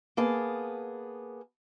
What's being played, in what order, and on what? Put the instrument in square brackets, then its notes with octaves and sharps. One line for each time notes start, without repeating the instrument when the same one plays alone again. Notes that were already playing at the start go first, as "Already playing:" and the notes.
[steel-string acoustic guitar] A#3 B3 G#4 A5